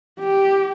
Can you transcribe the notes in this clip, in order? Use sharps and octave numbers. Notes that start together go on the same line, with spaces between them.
G4